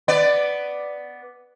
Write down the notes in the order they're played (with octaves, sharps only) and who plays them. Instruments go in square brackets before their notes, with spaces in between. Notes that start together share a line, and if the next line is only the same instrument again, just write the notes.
[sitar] B3 D5